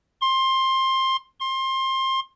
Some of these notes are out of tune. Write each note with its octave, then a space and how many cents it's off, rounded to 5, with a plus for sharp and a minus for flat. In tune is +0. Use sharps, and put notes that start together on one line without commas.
C6 +20
C6 +25